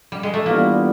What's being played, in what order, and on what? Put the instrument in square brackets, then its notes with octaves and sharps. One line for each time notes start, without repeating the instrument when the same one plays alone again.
[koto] G3
G#3
A3
[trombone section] E3 G3 B3 D4 F4 [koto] A#3